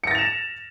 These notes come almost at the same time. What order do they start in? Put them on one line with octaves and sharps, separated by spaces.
C#7 A#6 A6 F7 E7